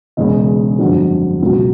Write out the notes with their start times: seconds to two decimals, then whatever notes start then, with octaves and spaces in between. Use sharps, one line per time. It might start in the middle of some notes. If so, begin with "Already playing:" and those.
0.17 E1 E2 C#3 D#5
0.78 G1 F2 D3 F#3
1.41 C#2 B2 F#3